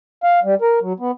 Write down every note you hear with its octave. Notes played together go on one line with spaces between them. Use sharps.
F5
G3
A#4
F#3
B3